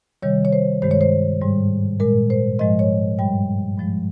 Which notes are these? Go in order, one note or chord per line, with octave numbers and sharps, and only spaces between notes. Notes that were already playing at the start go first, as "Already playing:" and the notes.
C3 D#3 G3 C#5
C#5
C5
G2 D#3 G#3 C5
C#5
C5
G#2 G3
A#2 G#3 A#4
C5
G#2 F3 G#3 D#5
C#5
G2 G3 G5
G2 F3 G#3